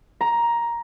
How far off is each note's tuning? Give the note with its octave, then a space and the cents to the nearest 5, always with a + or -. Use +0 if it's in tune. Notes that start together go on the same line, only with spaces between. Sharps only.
A#5 +10